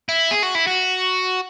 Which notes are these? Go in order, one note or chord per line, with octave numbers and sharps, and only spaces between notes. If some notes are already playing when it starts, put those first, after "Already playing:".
E4
G#4
F#4
E4
F#4